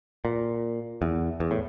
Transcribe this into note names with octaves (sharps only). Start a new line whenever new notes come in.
A#2
E2
E2
A2